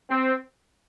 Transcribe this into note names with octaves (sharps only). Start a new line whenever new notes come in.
C4